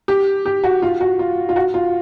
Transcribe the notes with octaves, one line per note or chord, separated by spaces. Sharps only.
G4
G4
F#4
F4
F#4
F4
F4
F#4
F4